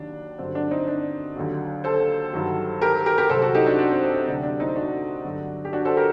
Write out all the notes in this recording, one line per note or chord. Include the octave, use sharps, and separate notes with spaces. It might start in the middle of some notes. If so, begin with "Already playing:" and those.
Already playing: D#2 D#3 F#3 D4
G2 D3 F#3 C4
D4
C4 D#4
D4
D#2 D3 F#3
A4 C5
G2 D#3 F#3
G4 A#4
G4 A#4
G4 A#4
C2 C3 F#3 A4 C5
F#4 A4
D#4 G4
D4 F#4
D4
C4
C4
C4
D2 C3 F#3 D4
D4
C4 D#4
D4 F#4
G2 D3 F#3
G4
D4 F#4
A4 C5
G4 A#4